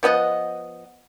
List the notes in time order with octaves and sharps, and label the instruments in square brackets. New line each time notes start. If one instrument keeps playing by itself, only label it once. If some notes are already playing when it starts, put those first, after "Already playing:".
[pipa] F3 B3 D#5 F#5